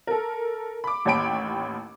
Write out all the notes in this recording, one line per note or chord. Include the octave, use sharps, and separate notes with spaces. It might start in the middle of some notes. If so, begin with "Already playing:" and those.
A4 A#4
B5 D6
A1 D#2 C#5 G5 B5 D7